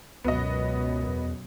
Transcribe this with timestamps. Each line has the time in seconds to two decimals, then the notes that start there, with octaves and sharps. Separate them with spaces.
0.24 C#2 F#2 B2 B3 F#4 D#5
1.08 E2